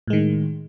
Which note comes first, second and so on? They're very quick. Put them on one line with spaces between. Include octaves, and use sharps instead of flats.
A2 G#3 D#3